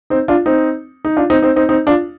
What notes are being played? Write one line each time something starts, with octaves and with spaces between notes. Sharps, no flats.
C4 D#4
D4 F4
C4 D#4
D#4
D4 F4
C4 D#4
C4 D#4
C4 D#4
C4 D#4
D4 F4